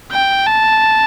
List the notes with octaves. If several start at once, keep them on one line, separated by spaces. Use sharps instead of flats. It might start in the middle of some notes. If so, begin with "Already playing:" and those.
G5
A5